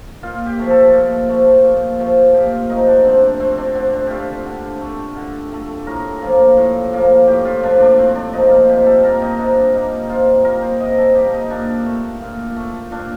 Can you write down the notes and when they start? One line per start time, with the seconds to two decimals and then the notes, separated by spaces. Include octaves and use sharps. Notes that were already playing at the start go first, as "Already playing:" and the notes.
0.23 A#2 F4
0.46 G4
0.59 F3 A3
0.70 A4
0.93 A#2
1.29 F3 A3
1.64 A#2
2.00 F3 A3
2.35 A#2 G4
2.53 F4
2.70 F3 A3 D#4
2.87 D4
3.05 D3 C4
3.23 D4
3.40 A3 C4
3.58 D4
3.75 D3 C4
3.94 D4
4.07 A3 F4 G4
4.46 D3
4.81 A3
5.17 D3
5.52 A3
5.87 A2 A#4
6.22 F3 A#3
6.57 A2
6.93 F3 A#3
7.27 A2 G4
7.45 F4
7.63 F3 A#3 D4
7.80 D4
7.98 A2 C4
8.15 D4
8.33 F3 A#3 D#4
8.51 F4
8.69 C3 G4
8.86 A4
9.04 G3 A#3 A#4
9.22 D#4
9.39 C3 D4
9.74 G3 A#3 D#4
10.09 C3 F4
10.44 G3 A#3 A#4
10.62 C5
10.80 C3 D#5
10.98 A4
11.15 G3 A#3 G4
11.33 D#4
11.50 A#2 D4
11.86 A3
12.21 A#2
12.56 A3
12.91 A#2 D4